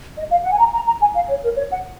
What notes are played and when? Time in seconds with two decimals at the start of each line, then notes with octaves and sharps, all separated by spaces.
0.17 D#5
0.31 F5
0.43 F#5
0.52 G#5
0.59 A#5
0.73 A#5
0.87 A#5
1.01 G#5
1.15 F5
1.29 C#5
1.43 A#4
1.57 C#5
1.71 F#5